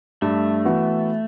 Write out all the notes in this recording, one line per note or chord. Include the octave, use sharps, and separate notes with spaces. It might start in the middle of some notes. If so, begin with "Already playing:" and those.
G2 A3
E3 B3 F#4